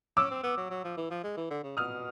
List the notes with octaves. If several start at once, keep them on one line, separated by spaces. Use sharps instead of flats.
C#4 D6 E6
C4
B3
F#3
F#3
F3
E3
F3
G#3
E3
D3
C#3
B2 D#6 F6